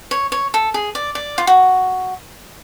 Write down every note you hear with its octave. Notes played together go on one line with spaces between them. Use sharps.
C#5
C#5
A4
G#4
D5
D5
F4
F#4